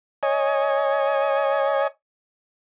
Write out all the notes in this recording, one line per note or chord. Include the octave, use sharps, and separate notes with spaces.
C#5 D#5 G#5